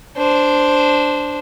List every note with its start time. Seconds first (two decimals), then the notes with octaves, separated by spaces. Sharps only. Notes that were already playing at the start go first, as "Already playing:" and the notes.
0.17 D4 C5